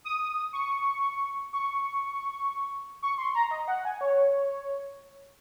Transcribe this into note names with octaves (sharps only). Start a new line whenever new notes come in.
D#6
C#6
C#6
C#6
C6
A#5
D#5
F#5
G#5
C#5